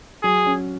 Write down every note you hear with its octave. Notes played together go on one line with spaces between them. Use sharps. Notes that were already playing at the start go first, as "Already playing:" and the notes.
F#3 G#4
C#4